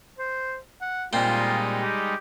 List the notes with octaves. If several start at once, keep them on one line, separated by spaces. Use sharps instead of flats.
C5
F#5
A#2 G3 G#3 C4 D#4 F4
G4